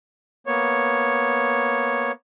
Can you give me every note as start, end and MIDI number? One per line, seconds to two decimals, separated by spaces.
0.47 2.12 58
0.47 2.12 59
0.47 2.12 73